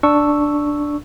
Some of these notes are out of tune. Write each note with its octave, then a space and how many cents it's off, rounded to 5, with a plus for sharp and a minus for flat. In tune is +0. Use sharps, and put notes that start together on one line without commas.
D4 +0 C#6 +0 E6 +0